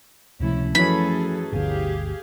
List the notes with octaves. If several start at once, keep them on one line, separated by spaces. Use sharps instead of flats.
C#2 C3 F3 A3 C#4 E4
F#2 E3 F3 A3 C#4 G#4 A4 B5
G1 D2 G4 G#4 F5